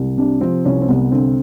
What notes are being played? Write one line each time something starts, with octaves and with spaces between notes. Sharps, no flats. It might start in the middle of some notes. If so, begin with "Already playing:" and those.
Already playing: C2
C3 D4
F3 C4
C2 C#4
C4
C2 B3
D3 C4